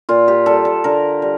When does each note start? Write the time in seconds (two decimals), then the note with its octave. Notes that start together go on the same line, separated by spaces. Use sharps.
0.09 A#2 F4
0.28 G4
0.46 G3 A4
0.65 A4
0.84 D3 A#4
1.22 G3